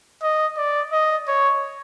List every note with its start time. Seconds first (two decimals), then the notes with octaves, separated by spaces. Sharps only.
0.23 D#5
0.58 D5
0.93 D#5
1.28 C#5